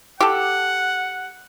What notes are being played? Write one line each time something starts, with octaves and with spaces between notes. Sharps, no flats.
G4 A4 F#5